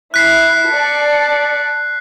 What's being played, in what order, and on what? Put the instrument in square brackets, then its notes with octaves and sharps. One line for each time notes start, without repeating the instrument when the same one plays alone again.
[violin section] E4 [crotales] F#6 B6 C7
[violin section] D5 A5 C#7